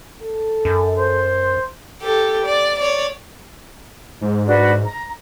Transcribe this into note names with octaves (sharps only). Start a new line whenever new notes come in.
A4
F#2
C5
G4 A4
D5
C#5 D5
G#2
D4 F#4 B4
A#5